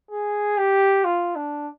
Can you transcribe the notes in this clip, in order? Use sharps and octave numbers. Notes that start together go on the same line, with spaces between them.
G#4
G4
F4
D4